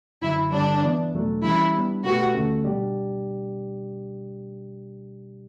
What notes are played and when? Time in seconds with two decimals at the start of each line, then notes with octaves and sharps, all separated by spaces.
0.22 F#2 D3 F#3 E4
0.52 G2 D3 G3 D4
0.82 E3 B3 E4
1.12 E2 B2 F#3 A3 D4
1.43 E3 G3 C#4 E4
1.74 G3 B3 D4
2.04 B2 A3 E4 F#4 G4 B4
2.34 D2 D3 A3 C#4
2.65 B2 G3 D4 G4 D5